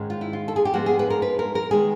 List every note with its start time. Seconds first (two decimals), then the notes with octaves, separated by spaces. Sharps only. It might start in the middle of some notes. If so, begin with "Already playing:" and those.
Already playing: G#2 D#3 G#3 C#4
0.10 F4
0.21 E4
0.33 F4
0.48 A4
0.56 G#4
0.65 G4
0.74 G#2 F3 G#3 B3 D4 F#4
0.86 G#4
0.99 B4
1.10 A#4
1.22 B4
1.39 A#4
1.55 A#4
1.71 D#3 G#3 B3 G#4